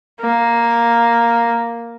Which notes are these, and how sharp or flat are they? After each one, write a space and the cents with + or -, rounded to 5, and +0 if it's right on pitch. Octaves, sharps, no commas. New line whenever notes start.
A#3 +0